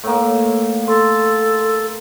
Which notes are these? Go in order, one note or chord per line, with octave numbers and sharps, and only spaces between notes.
A2 A#3
A4 C6